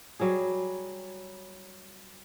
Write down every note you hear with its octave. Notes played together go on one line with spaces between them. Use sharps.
F#3 G3 G#4